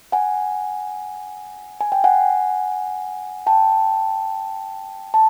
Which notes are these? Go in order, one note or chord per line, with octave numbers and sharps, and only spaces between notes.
F#5 G#5
G#5
G5
F#5 G#5
G5 A5
A5